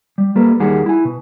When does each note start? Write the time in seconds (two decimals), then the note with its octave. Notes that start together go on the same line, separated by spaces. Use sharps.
0.18 G3
0.36 G3 A#3 A4 B4
0.60 D#2 D#3 G3 G#4 F#5
0.86 E4 G#5
1.05 B2